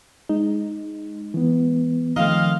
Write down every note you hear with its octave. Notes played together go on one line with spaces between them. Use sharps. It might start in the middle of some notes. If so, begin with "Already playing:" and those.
G#3 D#4
E3 B3
D#3 F3 A3 C4 D#5 F5